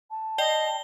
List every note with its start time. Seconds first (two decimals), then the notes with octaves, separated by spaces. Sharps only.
0.11 A5
0.38 D5 D#5 G5 G7